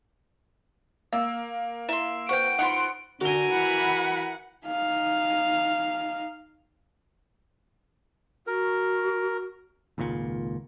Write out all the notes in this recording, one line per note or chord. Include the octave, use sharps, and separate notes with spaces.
A#3 E6
E4 E5 C6
B4 C5 F#5 G5 C#6 D7
D#4 F4 F#5 B5 C6
D3 F#4 A#4 G#5 G7
E3 F#5 B5
D#4 F5
F#4 A#4
G#1 C#2 A#2